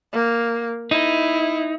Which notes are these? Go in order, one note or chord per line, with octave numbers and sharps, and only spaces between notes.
A#3
D#4 E4